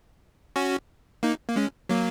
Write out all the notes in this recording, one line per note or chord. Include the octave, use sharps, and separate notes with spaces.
C#4 F#4
A#3 D#4
A#3
G#3 C#4
F#3 A#3